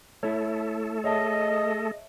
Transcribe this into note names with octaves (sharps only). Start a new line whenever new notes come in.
A3 E4 A4 C#5
G#4 C#5 D#5 E5 A5